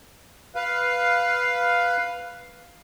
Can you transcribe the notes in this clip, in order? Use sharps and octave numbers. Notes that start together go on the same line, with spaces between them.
B4 F5